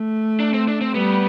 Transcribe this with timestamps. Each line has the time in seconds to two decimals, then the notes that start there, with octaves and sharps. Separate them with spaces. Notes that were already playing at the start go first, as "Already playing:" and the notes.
Already playing: A3
0.40 D4
0.54 C4
0.68 D4
0.81 C4
0.94 G3 B3